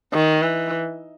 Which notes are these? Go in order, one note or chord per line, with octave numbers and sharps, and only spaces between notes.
D#3
E3